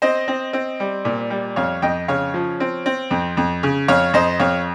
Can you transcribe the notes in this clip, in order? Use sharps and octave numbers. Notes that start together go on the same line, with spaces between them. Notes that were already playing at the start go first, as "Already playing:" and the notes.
C4 C5 D#5
C4
C4
G3
A#2
G3
F2 C#5 F5
F2 D#5 G5
C#3 C#5 F5
F3
C4
C4
F2
F2
C#3
F2 C#5 F5
F2 C5 D#5
F2 C#5 F5